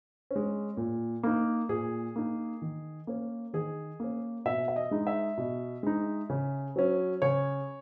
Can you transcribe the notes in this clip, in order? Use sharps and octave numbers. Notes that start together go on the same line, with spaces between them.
C#4
G#3
A#2
A#3 D#4
A#2 G#4
A#3 D#4
D#3
A#3 C#4
D#3 G#4
A#3 C#4
B2 E5
E5
D#5
G#3 D#4
E5
B2
G#3 D#4
C#3
F#3 C#4
C#3 C#5